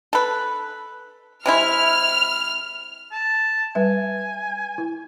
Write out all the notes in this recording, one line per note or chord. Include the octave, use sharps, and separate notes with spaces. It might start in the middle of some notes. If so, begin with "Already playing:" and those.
A4 B4
C3 G#3 E4 F6
A5
G3 B4 E5 G#5
E4